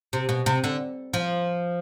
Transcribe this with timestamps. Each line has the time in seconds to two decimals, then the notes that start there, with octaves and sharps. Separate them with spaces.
0.13 C3
0.29 B2
0.46 C3
0.64 D3
1.13 F3